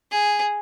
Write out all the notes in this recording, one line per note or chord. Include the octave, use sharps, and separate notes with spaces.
G#4